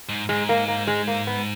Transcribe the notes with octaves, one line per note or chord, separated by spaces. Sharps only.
G#2
G#2 G#3
A#3
A#3
G#3
A#3
B3